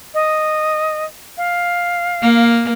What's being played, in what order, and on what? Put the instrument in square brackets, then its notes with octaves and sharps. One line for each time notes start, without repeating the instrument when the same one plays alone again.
[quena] D#5
F5
[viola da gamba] A#3